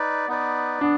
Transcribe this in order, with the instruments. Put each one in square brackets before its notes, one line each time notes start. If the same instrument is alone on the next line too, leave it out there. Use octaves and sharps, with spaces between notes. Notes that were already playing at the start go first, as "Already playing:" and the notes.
Already playing: [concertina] D#4 B4 D5
B3 D#4 B4 D5
[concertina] B3 [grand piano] D4